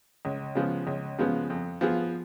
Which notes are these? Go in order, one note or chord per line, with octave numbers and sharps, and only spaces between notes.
C#2
C#3 F3 G#3 B3
C#2
C#3 F3 G#3 B3
F2
F3 B3 F4 G#4